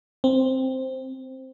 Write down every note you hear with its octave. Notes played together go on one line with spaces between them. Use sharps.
C4